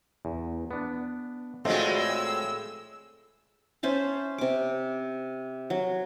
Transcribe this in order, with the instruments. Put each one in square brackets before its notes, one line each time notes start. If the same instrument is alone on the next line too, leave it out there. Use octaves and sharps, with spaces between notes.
[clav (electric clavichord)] E2
B3 D4
[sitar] A2 G#3 [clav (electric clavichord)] A3 C4 F4 [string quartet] F#4 D#5
[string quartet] E6
[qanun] C#4 C5 E5 A5
C3 D6
F#3